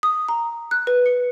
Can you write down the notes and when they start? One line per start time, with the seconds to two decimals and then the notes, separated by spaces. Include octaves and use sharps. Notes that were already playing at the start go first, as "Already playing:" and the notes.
0.03 D#6
0.29 A#5
0.71 F#6
0.87 B4
1.06 C#7